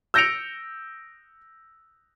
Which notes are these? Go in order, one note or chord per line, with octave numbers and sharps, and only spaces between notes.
E6 G6 A#6 C#7 D7 F7